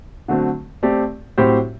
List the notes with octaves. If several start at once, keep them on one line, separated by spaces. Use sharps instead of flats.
D3 F#3 A3 C4
A3 C4 G4 D5
A2 F#3 C4 G4 C5